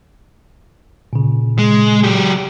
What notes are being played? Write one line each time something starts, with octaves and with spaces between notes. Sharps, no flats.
A#2 C#3
G#3
F#3 G4